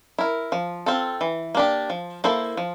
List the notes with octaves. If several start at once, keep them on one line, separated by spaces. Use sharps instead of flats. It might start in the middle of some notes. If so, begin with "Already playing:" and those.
E4 A#4
F3
C4 F4 A4
E3
A#3 D4 G4
F3
A#3 E4 A4 C5
F3